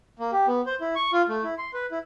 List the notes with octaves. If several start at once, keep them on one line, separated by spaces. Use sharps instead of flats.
A#3
G4
B3
C5
E4
C#6
F4
A3
E4
C6
B4
E4